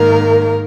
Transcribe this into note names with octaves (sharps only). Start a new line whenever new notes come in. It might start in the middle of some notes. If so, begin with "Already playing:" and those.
Already playing: G#2 D#3 A#3 A#4